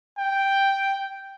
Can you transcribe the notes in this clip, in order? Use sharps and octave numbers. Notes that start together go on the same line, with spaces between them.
G5